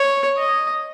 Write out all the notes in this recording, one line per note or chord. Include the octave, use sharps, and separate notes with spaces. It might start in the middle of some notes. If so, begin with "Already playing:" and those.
Already playing: C#5
D#5